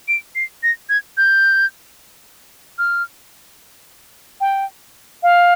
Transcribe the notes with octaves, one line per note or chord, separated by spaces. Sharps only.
D7
C7
A#6
G#6
G6
F6
G5
F5